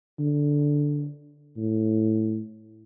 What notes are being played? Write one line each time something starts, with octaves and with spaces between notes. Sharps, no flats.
D3
A2